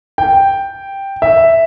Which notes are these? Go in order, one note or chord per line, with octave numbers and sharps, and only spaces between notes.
G5
E5